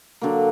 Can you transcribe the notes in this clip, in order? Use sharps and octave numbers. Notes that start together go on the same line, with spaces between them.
D3 F#3 A#3